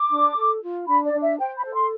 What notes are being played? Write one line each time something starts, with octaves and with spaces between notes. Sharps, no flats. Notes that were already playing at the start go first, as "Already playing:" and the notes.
Already playing: D6
D4
A4
F4
D4 B5
D5
D4
E5
C5 G5
B5
A4
C6